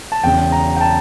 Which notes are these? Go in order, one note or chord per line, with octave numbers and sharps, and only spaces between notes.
A5
E1 E2 C#3 G5
A#5
G5
A5